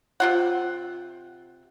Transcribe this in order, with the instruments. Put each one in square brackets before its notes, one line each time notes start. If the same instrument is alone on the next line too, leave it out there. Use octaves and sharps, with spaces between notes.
[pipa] C3 F4 F#5